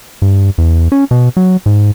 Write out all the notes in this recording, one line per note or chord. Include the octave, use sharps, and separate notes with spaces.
G2
E2
C#4
B2
F#3
G#2